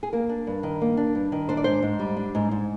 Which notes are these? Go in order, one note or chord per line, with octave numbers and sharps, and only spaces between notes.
G#4
A#3 A#4
D4
G2
D#3
A#3
D4
G2
D#3
D4 C5
D5
G#2 C5
G#2
G3
D4
G#2
G#2